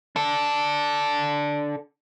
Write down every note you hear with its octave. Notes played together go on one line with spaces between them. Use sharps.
D4 A4